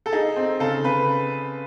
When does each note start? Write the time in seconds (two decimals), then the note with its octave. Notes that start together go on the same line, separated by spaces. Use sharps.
0.06 A4
0.12 D#4 G#4
0.36 C4
0.60 C#3 A4
0.84 C#3 B4